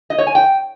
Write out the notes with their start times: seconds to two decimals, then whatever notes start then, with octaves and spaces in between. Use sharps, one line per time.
0.10 D#5
0.18 C#5
0.27 G#5
0.35 G5